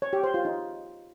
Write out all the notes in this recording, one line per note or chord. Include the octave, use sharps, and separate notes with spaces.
C#5
G4
C5
F4
D#4